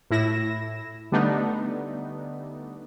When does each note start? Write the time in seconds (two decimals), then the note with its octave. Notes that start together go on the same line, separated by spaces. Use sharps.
0.11 A2 E4 A#6 E7
1.12 D3 G3 A3 B3 D4 D#4